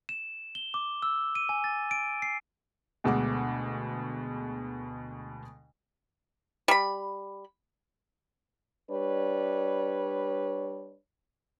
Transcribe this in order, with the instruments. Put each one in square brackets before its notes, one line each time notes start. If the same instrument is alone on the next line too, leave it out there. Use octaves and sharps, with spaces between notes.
[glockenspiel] E7
G7
D6
E6
D#7
G#5
A6
D7
C7
[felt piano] D2 B2 G#3 F#5 D6
[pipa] G3 B5
[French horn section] G3 D4 B4 C#5